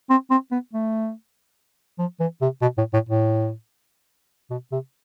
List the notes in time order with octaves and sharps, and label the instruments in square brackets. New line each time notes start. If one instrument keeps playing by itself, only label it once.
[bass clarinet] C4
C4
B3
A3
F3
E3
C3
B2
A2
A2
A2
B2
C3